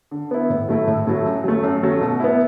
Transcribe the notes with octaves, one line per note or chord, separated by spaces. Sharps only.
D3
B3 E4
A2
F#3 A3 E4
A2
F#3 A3 E4
F#2
F#3 A3
F#2
F#3 A3
B2
B3 E4